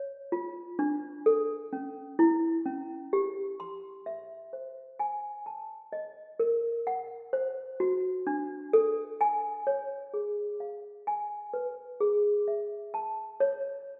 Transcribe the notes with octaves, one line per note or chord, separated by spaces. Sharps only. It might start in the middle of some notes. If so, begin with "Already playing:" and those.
Already playing: C#5
F4
D4
A4
C#4
E4
C#4
G4
C6
E5
C5
G#5
A5
D#5
A#4
F#5
C5
F#4
D4
A4
G#5
C#5
G#4
F5
G#5
B4
G#4
E5
A5
C#5